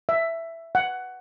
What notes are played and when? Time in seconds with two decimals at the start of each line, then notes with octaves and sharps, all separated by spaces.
0.09 E5
0.75 F#5